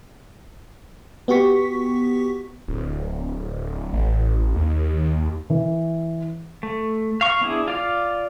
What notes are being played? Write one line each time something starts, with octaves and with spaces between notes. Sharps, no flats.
B3 F#4 G4 C#6 B6
D1
A1
D#2
E3
A3
F5 C#6
B3 D4 E4 G#4
F4 D5 F5